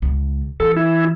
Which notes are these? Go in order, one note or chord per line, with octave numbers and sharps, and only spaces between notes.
C#2
E3 A4
E4